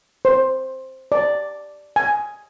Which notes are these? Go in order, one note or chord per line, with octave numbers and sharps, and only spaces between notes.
C5
D5
G#5